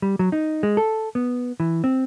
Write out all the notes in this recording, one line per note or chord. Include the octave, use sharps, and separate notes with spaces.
G3
F#3
D#4
G#3
A4
B3
E3
C4